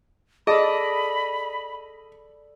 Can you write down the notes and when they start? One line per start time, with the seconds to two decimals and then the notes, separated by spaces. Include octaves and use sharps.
0.47 G#4 A4 D5 D#5 A5 B5